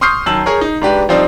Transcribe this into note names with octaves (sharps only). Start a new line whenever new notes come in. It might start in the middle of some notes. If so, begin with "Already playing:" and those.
C6 C#6 D#6 F6 G6 C7
F#2 D#3 A5 E6 F#7
G#4 A#4 C#5
D#4
G#2 D4 G4 B4
F3 G3 C4 D4 D#4